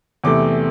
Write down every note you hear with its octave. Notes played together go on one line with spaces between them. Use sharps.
E2 C3 A3 D6